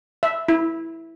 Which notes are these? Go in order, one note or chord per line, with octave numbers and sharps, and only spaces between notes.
E5
E4